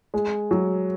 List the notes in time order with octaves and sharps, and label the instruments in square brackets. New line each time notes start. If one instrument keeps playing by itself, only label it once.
[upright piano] G#3
F#3